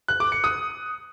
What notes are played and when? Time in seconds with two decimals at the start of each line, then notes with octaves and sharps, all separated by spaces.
0.08 F#6
0.20 D6
0.32 C#7
0.44 D#6